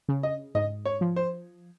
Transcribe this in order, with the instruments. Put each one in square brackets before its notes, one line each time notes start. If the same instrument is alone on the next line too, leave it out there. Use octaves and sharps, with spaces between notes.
[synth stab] C#3
[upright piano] D#5
[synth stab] G#2 [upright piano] D#5
[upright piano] C#5
[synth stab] F3
[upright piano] C5